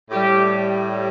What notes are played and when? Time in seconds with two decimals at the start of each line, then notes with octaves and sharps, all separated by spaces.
0.10 A2 G4
0.16 G3